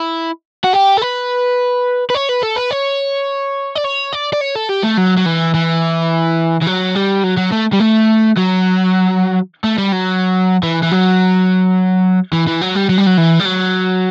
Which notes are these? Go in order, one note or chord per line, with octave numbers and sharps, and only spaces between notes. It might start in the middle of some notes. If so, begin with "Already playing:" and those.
Already playing: E4
F#4
G4
A4
B4
B4
C#5
B4
A4
B4
C#5
D5
C#5
D5
D5
C#5
A4
G4
A3
F#3
F#3
E3
E3
E3
F#3
G3
F#3
F#3
A3
G3
A3
F#3
A3
G3
F#3
E3
E3
F#3
E3
E3
F#3
G3
F#3
G3
F#3
E3
G3
F#3